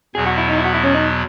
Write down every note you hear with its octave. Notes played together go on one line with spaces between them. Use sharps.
E2 B2 F#3 B3 G#4
F#4
E4
D#4
E4
F#4
E4
C#4
D#4